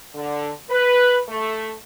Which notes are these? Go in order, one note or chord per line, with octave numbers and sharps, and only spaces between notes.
D3
B4
A3